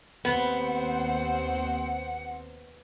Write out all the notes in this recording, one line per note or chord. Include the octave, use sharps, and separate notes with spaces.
D#2 B3 C4 C5 F#5